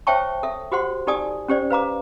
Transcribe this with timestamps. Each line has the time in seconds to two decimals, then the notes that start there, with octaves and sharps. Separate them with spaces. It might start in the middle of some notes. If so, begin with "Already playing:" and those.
0.07 C5 C#5 E5 G5 A5 C#6
0.43 A4 E5
0.72 F#4 G4 C5 F#5 C6
1.07 D#4 G4 A4 D5 G#5 D#6
1.48 C#4 G4 C5 D5
1.70 B4 F5 A#5 D6